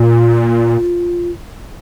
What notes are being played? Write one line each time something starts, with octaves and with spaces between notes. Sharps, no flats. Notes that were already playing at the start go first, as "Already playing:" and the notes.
Already playing: A#2 F4